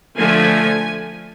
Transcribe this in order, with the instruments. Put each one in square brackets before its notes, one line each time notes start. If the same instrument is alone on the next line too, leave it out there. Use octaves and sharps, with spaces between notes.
[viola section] D3 F3 A3 G#5